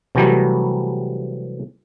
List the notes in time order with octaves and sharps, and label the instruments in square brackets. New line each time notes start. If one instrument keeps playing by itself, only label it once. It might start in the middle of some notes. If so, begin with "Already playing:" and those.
[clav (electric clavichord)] C3 E3 F#3 G3 A3